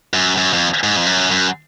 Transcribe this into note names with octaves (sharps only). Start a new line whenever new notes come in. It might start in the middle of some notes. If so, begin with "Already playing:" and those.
F#2
F#2
F2
G#2
F2
F#2
F#2